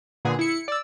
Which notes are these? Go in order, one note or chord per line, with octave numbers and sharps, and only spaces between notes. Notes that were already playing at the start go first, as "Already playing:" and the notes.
A#2 D3 B3 G#4
E4 C#7
D5 E6